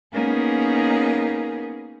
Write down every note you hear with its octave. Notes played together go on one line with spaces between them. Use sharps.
A#3 B3 C#4 D#4 G#4 A#4